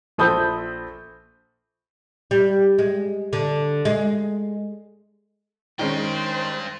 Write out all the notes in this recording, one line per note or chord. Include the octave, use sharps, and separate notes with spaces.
A#1 A4 C5 B5 D#6 G6
G3
G#3
D3
G#3
D#3 G#3 C#4 D4 C5 G5